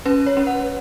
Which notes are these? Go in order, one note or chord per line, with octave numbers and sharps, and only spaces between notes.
C#4 B4
C#5
C#4
F#5